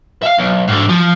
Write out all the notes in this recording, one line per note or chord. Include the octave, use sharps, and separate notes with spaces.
E5 F5
B1
G#2 D3
F3